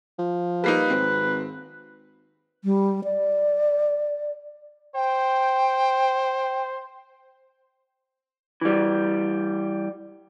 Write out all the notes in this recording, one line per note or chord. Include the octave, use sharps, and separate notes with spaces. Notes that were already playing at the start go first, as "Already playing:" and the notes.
F3
G3 A#3 D#4 B4
G#1 C4
G3
D5
C5 G5
E3 G3